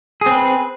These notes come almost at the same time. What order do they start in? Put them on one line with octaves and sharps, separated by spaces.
G#4 C4 B4